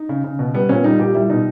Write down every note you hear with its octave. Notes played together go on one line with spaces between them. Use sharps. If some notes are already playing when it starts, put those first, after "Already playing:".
Already playing: D#4
C#3
C#3
B2
G3 B3
A#2 C#4
G3 D#4
A#2 G4
G3 E4
B2 D#4